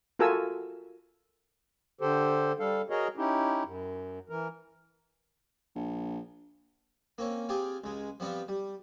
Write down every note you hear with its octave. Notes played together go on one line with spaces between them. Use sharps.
F4 F#4 A4 A#4 G#5 E6
D3 G4 A4 C5
G3 A4 F5
F#4 G#4 A#4 C#5 D#5
C#4 D#4 E4 G4
F#2
E3 A#4
A#1
A#3 C4 C#4
C4 F4 G4 G#4
C#2 G#3
F3 G3 B3 C4 F4
G3